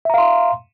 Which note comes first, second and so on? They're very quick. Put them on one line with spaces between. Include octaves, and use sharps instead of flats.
E5 A#5 F5 C6